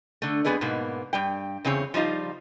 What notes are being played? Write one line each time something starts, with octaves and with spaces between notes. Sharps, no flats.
D3 A3
F2 E3 B3 G#4 B4 D5
G#2 B2 A#3 B3
G2 G3 G5
E2 C#3 C4 G#4 C#5
F3 G3 D#4 F4